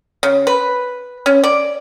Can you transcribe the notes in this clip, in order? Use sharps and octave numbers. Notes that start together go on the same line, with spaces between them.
C#3
B4
C#4
D5